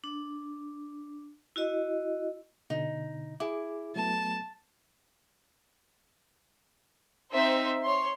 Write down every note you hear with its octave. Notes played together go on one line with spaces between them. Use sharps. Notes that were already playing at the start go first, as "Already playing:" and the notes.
D4
E4 F#4 D#5
B2 D3 D#4
E4 G#4 D6
F#3 A3 B3 A5
C4 D#4 C5 E5
C#5 C6